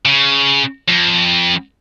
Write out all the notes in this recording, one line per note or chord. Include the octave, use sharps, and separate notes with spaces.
C#3
F2